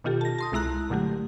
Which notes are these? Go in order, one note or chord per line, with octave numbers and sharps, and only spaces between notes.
B2 D#3 F4 G4 A4
A5 A#6
A5 C6 D#6
C2 G#3 E4 A#5 F#6
A#2 D3 F#3 A3 G4